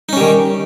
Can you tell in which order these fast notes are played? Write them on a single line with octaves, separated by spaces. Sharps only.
D#4 C#4 G3 D#3